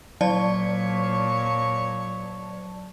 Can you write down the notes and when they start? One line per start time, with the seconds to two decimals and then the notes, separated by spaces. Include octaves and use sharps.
0.21 A#2 F#3 C#5 D5 A5